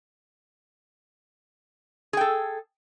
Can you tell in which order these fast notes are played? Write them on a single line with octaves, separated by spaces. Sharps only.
G#4 G5 A4